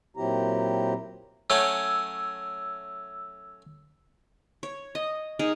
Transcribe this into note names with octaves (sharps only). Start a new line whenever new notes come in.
A#2 F#3 C4 E4 G4 A#5
F#3 A3 C#4 E6
C#5
D#5
D#4 G#4 A#4